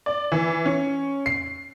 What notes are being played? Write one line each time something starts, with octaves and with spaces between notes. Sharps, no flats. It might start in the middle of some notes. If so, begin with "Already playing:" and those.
D5
E3
C#4
C7